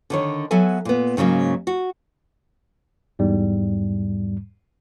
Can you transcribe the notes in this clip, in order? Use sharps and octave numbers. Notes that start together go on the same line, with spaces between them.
D3 D#3 C#5
F#3 B3 A4 E5 G#5
A#2 B3
G#2 C#3 F#3 G3 A#3
F#4
E2 G#2 G3